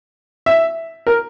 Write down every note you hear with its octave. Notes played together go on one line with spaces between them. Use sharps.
E5
A#4